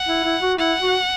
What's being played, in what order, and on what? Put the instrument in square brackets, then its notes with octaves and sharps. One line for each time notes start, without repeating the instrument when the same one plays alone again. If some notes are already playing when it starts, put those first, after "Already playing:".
Already playing: [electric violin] F#5
[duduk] E4
E4
F#4
[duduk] E4 [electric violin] F#5
[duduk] F#4